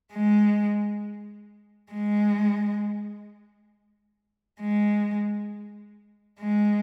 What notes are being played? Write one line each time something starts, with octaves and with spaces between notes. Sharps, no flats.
G#3
G#3
G#3
G#3